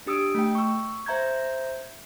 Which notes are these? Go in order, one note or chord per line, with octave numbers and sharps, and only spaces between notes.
D4 G4 D#6 E6 D7
A3 G5
C#6 E6
C5 E5 A#5 G6 G#6